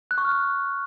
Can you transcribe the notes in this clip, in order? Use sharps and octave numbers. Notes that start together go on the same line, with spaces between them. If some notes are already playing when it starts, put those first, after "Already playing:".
F#6
C#6
F6
F#6